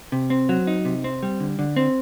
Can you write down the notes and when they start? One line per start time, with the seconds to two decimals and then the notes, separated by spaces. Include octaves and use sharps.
0.12 C3
0.30 C4
0.49 F#3
0.67 D#4
0.85 C3
1.04 C4
1.23 G3
1.40 D3
1.59 D3
1.76 C4